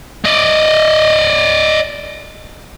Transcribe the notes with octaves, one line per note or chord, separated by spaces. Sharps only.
D5 D#5